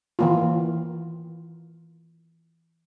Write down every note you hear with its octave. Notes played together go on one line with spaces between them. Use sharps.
E3 A#3 F4